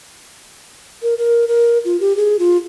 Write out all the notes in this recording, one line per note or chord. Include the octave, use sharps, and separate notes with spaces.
A#4
A#4
A#4
F4
G4
G#4
F4